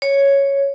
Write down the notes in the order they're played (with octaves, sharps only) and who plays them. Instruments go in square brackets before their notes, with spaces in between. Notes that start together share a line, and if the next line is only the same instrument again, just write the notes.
[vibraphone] C#5